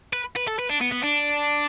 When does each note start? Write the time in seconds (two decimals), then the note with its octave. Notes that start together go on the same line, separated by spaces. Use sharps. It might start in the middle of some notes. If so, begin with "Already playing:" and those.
0.13 B4
0.36 B4
0.47 A4
0.59 B4
0.70 D4
0.81 B3
0.92 B3
1.04 D4